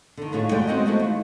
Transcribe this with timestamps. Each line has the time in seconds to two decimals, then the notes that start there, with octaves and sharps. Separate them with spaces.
0.17 D3 D#3
0.32 D#2 A2 F4 G#4 C#5
0.51 D#2 G#3 A3 F#4 D5 G5
0.67 B3 C4 F#4 A#4 B4 D#5
0.86 G#3 A3 B3 E4 F#4 C5
1.00 D#2